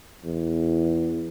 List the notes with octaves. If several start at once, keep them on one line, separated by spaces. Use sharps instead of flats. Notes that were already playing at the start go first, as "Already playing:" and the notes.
E2